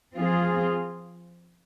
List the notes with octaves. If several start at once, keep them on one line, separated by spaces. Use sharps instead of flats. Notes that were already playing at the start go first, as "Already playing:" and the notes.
F3 C4 F4 G#4